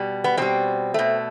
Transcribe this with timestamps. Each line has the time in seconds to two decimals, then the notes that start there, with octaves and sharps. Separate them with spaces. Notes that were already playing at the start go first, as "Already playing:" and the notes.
Already playing: B2 G3
0.24 B3
0.37 B2 G3 C4
0.94 B2 A3